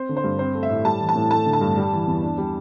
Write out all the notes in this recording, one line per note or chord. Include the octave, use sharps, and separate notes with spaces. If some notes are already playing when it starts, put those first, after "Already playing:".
Already playing: C4 C5
D3
C5
G2
C4 C5
A3
E5
A2
G3 A5
E3
A5
A2
A3 A5
D3
A5
G2
G3
E3
E2
D4
G3